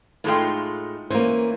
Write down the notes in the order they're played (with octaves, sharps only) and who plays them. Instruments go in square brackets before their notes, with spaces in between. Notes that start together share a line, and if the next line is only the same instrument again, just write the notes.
[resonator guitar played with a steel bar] A2 G#3 F4 [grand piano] A3 D#4 G5
[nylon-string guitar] E3 A#3 [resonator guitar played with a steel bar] C#4 [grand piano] C5